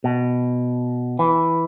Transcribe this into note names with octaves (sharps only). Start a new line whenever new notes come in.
B2
E3